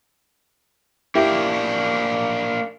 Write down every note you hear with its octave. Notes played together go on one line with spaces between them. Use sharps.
A#3 D4 E4 G4